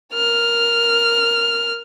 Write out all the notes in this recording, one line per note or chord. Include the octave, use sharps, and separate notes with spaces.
A#4 F6